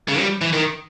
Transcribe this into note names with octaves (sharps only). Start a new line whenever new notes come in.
C#3
G3
E3
D#3